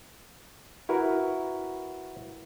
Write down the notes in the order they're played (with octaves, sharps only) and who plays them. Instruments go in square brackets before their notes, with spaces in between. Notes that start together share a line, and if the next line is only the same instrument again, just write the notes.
[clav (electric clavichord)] E4 F#4 A#4 B4